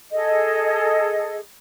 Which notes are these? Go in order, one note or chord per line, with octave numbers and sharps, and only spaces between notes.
G#4 A4 D#5